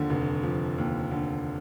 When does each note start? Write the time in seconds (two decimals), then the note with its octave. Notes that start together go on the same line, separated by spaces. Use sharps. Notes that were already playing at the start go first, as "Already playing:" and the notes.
Already playing: D#2 D3 F3
0.10 F1
0.43 F3
0.78 D#2
1.11 D3